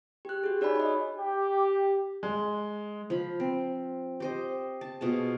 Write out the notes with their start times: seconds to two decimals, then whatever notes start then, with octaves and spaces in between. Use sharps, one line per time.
0.25 G4 F#6
0.44 F#4 G#4
0.61 D#4 C#5 D5 G#5 B5
0.76 C#5 D#5
1.16 G4
2.23 G#3
3.10 F3 B5
3.40 C4
4.20 G4 C5 D#5
4.81 A5
5.01 B2 F4 G#4 A5